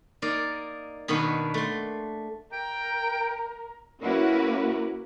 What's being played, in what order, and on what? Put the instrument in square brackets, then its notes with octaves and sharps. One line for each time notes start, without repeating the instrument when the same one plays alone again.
[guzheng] A#3 D#4 A#4 D5
B2 D#3 A#3 B3 D4 F#4
A3 C6
[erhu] A#4 [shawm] G5
[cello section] A#3 C#4 E4 F#4 A#4 B4